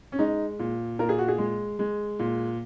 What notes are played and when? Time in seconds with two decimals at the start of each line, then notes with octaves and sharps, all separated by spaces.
0.12 C#4
0.19 G#3 D#4
0.59 A#2
0.99 A#2 A#4
1.09 G#4
1.18 F#4
1.28 G#4
1.38 G#3
1.79 G#3
2.19 A#2